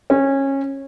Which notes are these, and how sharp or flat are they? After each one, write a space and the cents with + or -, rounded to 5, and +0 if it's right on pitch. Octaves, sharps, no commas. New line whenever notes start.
C#4 -20